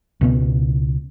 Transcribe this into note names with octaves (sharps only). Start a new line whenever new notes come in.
C#2 B2 B3